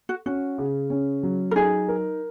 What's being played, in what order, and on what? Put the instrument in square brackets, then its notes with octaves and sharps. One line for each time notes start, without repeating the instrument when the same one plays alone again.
[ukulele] F#4
[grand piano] C#4 [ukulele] F#4
[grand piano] C#3
C#4
F#3
[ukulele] A#4
[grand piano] D#4 [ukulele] G#4
[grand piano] A#4